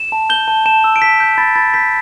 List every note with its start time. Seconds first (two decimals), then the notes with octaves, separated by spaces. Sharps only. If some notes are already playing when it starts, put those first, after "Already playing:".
Already playing: E7
0.12 A5
0.30 G6 G7
0.48 A5
0.66 A5 E7
0.84 E6
0.96 D7
1.02 A5 B6
1.20 G6
1.38 B5 A6
1.56 B5 A6
1.74 G6 B6